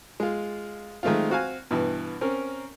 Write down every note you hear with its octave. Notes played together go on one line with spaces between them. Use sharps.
G#3 F4
D#3 G#3 A3 C4 F4
C4 F#4 F5 G#5
G2 B2 E3
C4 C#4 A#4